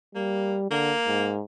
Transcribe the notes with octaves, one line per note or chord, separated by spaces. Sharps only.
G3 A#3
D3 A#3
G#2